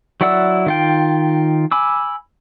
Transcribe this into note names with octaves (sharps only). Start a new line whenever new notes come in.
F#3 E4 D5 F#5 E6
D#3 F4 G5
G#5 B5 D6 E6